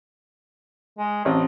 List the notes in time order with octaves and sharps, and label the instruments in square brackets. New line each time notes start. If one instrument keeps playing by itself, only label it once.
[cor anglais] G#3
[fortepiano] A1 C4 C#5 [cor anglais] D#5